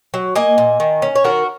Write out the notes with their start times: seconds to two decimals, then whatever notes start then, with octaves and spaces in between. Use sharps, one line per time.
0.14 F#3
0.35 A#3 D#5 G#5
0.58 A#2
0.80 D#3
1.02 C#4
1.15 C#5
1.24 D#3 F#4 A#4